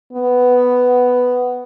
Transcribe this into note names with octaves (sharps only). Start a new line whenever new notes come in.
B3